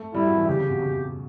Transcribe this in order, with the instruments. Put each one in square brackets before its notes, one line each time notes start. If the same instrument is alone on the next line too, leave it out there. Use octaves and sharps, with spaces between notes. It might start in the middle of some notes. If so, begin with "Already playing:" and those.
Already playing: [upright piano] A3
[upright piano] G3 [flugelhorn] E4
[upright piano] F#3
E3
[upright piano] C#3 [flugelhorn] G4
[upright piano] C#3
B2
C#3